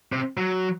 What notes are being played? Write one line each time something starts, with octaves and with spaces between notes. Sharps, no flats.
C3
F#3